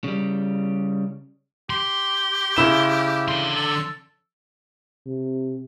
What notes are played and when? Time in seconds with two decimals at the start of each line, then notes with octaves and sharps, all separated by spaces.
0.04 C#3 G3
1.70 G4 C6
2.56 C#3 E4 E7
3.28 D3 C6
3.55 A4
5.07 C3